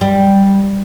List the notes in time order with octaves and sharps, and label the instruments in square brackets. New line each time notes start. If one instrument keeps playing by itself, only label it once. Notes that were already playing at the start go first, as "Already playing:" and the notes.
[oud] G3